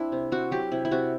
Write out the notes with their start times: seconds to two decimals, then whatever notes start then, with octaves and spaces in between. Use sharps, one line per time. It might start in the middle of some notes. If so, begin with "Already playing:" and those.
Already playing: C4 D4 E4
0.12 C3
0.32 C4 F#4
0.51 F#3 G4
0.72 C3 E4
0.85 E4
0.91 C3 F#4